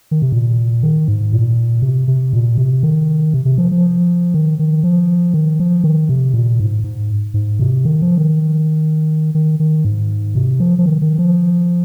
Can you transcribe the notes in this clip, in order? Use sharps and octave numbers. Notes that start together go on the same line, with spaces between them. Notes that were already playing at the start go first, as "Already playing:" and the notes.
D#3
C3
A#2
D#3
G#2
A#2
C3
C3
A#2
C3
D#3
C3
C3
F3
F3
D#3
D#3
F3
D#3
F3
D#3
C3
A#2
G#2
G#2
G#2
C3
D#3
F3
D#3
D#3
D#3
G#2
C3
F3
F3
D#3
D#3
F3